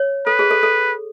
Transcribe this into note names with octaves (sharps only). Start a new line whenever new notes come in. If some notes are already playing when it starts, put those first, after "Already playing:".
Already playing: C#5
A4 B4
G#4
A4
A4